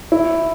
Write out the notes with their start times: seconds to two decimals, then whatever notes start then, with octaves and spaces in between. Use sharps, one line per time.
0.12 E4